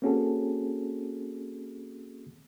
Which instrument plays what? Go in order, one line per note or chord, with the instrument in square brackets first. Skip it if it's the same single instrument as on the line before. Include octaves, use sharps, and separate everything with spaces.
[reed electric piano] A#3 C4 C#4 F#4 G#4 A4